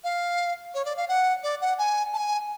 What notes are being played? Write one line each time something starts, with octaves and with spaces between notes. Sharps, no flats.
F5
C#5
D5
F5
F#5
D5
F#5
G#5
A5
G#5